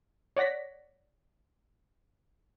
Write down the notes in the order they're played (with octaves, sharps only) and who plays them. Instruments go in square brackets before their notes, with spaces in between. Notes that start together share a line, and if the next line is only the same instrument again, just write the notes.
[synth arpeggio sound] C#5 D5 F#5 A#6 B6